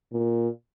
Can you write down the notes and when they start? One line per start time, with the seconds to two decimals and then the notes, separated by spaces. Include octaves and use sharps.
0.12 A#2